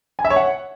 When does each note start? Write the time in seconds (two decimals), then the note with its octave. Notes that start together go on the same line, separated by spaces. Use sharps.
0.19 G#5
0.25 E5
0.30 C#5
0.36 F#5